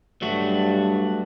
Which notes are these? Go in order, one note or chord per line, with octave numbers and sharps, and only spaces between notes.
G2 F#3 A3 F#4